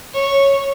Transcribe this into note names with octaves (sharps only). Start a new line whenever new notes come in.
C#5